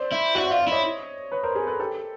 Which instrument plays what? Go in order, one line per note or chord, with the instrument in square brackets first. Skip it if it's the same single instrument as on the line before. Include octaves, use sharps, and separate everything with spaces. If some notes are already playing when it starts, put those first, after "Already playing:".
Already playing: [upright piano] C5 D5
[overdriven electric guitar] E4
[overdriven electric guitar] F#4 [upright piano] D5 E5
[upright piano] D5 E5
[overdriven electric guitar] F4
[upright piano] D5 E5
[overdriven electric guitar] E4 [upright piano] C#5 D#5
[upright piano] B4 C#5
A#4 C5
G#4 A#4
A4 B4
G4 A4